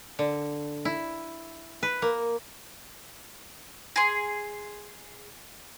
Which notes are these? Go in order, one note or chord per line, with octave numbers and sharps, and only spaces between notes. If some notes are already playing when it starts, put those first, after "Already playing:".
D3
E4
B4
A#3
G#4 C6